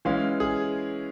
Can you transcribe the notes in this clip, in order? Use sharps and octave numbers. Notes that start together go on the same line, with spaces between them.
E3 G#3 C#4 F5
G#4